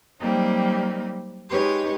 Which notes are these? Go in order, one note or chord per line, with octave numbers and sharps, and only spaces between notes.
F#3 G3 A#3 C4 D#4
G#3 D#4 G4 B4 C#5